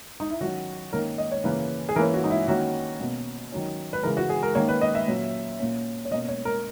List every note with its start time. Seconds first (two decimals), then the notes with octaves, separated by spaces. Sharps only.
0.20 D#4
0.30 E4
0.41 D#3 F#3 C#4 F#4
0.92 D#3 A#3 C#4 A#4
1.18 D#5
1.32 C#5
1.44 C#3 E3 A#3 C#4 B4
1.89 G#4
1.96 E3 A#3 C#4 A#4
2.14 F#4
2.24 D#4
2.30 E4
2.48 D#3 A#3 C#4 F#4
3.00 B2 A#3 C#4
3.52 D#3 F#3 C#4
3.93 B4
4.03 C#3 E3 G#3 A#4
4.17 F#4
4.29 G#4
4.43 A#4
4.55 D#3 A#3 C#4 C#5
4.69 B4
4.81 D#5
4.95 E5
5.07 A#2 F#3 C#4
5.59 A#2 A#3 C#4
6.05 C#5
6.11 B2 A#3 C#4 D#5
6.28 C#5
6.45 A#4